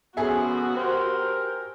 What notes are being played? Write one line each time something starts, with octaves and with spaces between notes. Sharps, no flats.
C#3 F3 B3 F#4 G#4 A4 E5
G4 A#4 C5